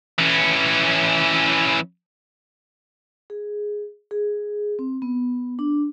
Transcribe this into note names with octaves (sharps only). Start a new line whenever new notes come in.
E3 C#4
G#4
G#4
C4
B3
D4